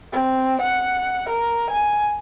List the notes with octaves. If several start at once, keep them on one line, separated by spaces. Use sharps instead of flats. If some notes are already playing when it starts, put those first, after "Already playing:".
C4
F#5
A#4
G#5